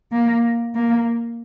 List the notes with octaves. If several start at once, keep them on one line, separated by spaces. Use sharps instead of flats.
A#3
A#3